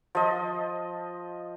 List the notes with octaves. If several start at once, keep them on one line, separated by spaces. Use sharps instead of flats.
F3 D#5